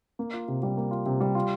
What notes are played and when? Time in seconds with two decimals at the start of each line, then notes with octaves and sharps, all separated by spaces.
0.19 A#3
0.33 F4
0.48 C3
0.63 G3
0.77 A#3
0.91 F4
1.06 C3
1.20 G3
1.35 F4